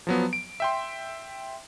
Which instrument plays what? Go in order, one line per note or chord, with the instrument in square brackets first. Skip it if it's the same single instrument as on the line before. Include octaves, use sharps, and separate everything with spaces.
[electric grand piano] F3 F#3 B3
D7
E5 G5 C6